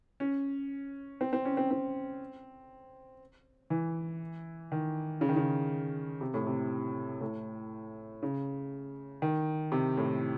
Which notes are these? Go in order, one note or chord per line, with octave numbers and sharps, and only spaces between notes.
C#4
C4
C4
C#4
C4
C4
E3
D#3
C#3
D#3
C#3
C3
A2
C3
A2
C#3
D#3
C3
A2